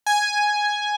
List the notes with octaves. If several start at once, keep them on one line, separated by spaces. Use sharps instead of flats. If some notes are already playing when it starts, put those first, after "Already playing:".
G#5